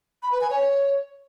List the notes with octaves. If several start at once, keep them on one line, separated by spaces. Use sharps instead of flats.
B5
B4
G#5
C#5